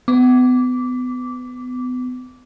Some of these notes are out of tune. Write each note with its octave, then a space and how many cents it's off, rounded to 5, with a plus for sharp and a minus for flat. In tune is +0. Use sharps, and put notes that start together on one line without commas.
B3 +30 D6 -15